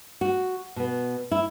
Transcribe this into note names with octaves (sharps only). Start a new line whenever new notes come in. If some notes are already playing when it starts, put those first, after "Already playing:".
F#4
B2 B3
E4